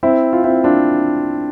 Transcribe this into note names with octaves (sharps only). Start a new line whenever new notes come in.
C4 E4
F4
C4 E4
D4 F4